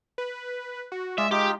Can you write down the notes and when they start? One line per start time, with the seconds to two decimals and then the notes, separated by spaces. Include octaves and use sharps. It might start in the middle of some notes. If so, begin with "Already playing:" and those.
0.18 B4
0.92 F#4
1.18 G#3 F4 G#4 D5 E5
1.31 D#4 F4 G4